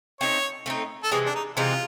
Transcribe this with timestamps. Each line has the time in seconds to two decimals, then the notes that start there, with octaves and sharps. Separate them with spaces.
0.21 A3 C4 D#4 C#5
0.66 A3 C4 D#4
1.03 A4
1.11 C3 E3 G#3 C4 G#4
1.26 D4
1.35 D#4
1.57 C3 E3 G#3 C4 F4